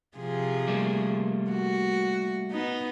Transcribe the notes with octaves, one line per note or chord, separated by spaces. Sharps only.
C3 F3 G#4
G3 A3 A#3
F#4
B3 D#4